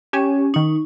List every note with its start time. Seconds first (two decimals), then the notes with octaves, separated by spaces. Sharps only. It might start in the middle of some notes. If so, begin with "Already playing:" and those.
0.13 C#4 G4 C#5 G#5
0.54 D#3 D#4 C#6